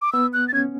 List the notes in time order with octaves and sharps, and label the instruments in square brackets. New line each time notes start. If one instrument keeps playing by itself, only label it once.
[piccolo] D6
[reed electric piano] B3 [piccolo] E6
[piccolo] F#6
A6
[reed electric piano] C#4 [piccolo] G#6